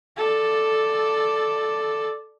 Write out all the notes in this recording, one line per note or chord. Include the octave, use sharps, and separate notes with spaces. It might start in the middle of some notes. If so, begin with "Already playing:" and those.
A4 D5